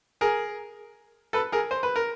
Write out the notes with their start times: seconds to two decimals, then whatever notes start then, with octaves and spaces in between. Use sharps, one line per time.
0.21 G#4 A#4
1.33 A4 B4
1.52 G#4 A#4
1.71 C5
1.83 B4
1.96 A#4